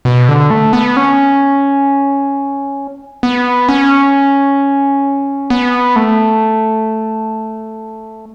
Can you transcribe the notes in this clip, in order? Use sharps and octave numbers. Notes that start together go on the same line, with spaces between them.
B2
D3
A3
B3
C#4
B3
C#4
B3
A3